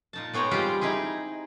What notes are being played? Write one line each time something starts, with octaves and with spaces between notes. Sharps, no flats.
A#2 D#4 A5
G#3 B3 C#5 G5 A#5
G3 G#3 C4 F4 G4 G5
D#4 E4 G4 G#4